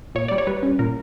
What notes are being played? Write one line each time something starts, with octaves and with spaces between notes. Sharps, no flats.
A#2 C#5
G3 D5
C#5
G3 B4
C#4
A#2 A#4